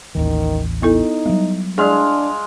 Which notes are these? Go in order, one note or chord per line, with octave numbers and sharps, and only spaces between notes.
A1 D#2 D#3 E3
B3 D#4 E4 A4
F#3 G3 B3
G#3 D4 G#4 D5 F5